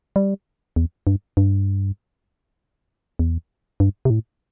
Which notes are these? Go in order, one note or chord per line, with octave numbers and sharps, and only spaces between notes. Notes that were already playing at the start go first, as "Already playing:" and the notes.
G3
E2
G2
G2
E2
G2
C3
A2